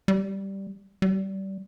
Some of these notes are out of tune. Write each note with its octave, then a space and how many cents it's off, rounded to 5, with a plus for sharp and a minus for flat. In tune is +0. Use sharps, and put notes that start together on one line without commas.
G3 -5
G3 -25